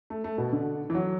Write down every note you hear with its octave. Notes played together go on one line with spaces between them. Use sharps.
A3
A3
B2
D3
E3
F#3